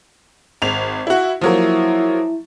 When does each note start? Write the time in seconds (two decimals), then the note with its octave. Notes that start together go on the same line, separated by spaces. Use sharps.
0.62 G#1 F7
1.07 E4 F#4
1.41 F3 F#3 A#3 E4